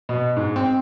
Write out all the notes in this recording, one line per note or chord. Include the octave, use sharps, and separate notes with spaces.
B2
G#2
C4